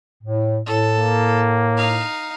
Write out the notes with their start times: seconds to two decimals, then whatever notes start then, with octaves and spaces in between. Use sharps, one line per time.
0.24 A2
0.66 A2 A4
0.96 A#3
1.77 D#4 F5